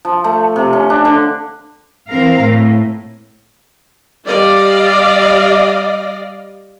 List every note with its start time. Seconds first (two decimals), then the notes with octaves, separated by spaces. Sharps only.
0.05 F3
0.24 A3
0.56 C3
0.73 C#4
0.90 D4
1.05 D3
2.09 E3 C4 A#4 F5
2.41 A2
4.26 G3 D5 D#5 F5